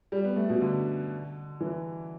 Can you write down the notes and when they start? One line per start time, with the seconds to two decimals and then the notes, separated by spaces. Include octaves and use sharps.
0.12 G3
0.25 B3
0.36 A3
0.49 B2
0.62 D3
1.60 E3